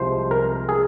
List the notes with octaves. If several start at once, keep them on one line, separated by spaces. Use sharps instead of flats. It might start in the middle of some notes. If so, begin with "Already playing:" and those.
Already playing: C2 C3 F3 G#3 C5
A#4
G#4